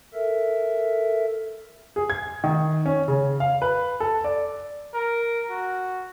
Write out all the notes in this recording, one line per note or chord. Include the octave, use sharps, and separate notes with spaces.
A4 A#4 E5
G#4
G#6
D#3
C#4
C#3
F5
B4
A4
D5
A#4
F#4